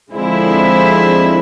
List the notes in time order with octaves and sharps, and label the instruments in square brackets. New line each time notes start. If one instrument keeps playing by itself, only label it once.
[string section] D3 F3 G#3 C4 E4